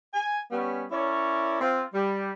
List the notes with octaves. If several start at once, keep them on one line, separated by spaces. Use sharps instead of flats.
G#5
G3 B3 C#4
C#4 E4 A#4 C#5 D5
C4 F4
G3